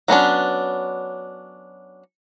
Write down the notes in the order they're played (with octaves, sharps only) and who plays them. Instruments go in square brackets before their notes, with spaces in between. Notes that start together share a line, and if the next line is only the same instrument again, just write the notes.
[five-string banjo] F#3 B3 C#4 D4